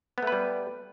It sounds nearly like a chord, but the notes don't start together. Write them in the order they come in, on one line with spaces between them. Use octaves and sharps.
B3 A3 B4 G3